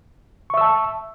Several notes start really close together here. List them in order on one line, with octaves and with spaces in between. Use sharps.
C#6 E5 E6 A5